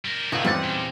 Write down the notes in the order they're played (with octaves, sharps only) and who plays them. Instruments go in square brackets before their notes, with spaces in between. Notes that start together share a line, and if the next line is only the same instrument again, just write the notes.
[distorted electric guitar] G3 A#4
[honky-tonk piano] C#2 [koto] D3 D#4 [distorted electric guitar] F#4 B4
[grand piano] E2 A6 [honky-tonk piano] G3 [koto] C4 C#4 [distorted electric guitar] F#5
[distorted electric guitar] A#2